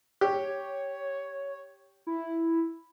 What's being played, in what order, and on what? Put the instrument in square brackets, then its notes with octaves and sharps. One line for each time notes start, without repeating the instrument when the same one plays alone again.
[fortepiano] G4 [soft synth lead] C#5
[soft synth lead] E4